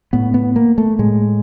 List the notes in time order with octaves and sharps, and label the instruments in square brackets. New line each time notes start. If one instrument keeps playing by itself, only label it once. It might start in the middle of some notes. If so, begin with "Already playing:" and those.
[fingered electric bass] A2 B3
B3
A#3
A3
A2 G#3